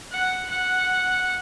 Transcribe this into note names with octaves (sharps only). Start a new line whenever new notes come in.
F#5
F#5